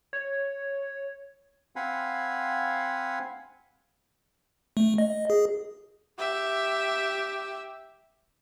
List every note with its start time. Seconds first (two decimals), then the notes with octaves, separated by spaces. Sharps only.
0.13 C#5
1.76 C4 F5 F#5 G#5 B5
4.77 A3
4.98 D#5
5.30 G#4
6.18 G4 E5